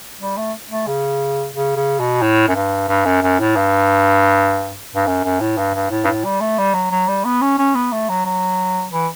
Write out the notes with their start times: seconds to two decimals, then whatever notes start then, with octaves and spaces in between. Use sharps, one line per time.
0.21 G3
0.37 A3
0.70 A3
0.87 C#3
1.54 C#3
1.76 C#3
2.00 B2
2.22 A2
2.48 F#2
2.55 G2
2.89 G2
3.05 F#2
3.23 F#2
3.39 A2
3.56 G2
4.95 G2
5.07 F#2
5.24 F#2
5.41 A2
5.58 G2
5.74 G2
5.91 A2
6.04 G2
6.07 A2
6.25 G3
6.41 A3
6.58 G3
6.75 F#3
6.91 F#3
7.08 G3
7.24 B3
7.41 C#4
7.59 C#4
7.75 B3
7.92 A3
8.09 F#3
8.25 F#3
8.92 E3